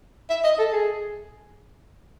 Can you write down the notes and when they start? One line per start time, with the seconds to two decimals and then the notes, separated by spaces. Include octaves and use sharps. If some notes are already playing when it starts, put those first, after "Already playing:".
0.30 E5
0.44 D#5
0.59 A4
0.73 G#4